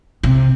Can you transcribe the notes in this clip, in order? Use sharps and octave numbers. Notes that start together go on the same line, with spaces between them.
C3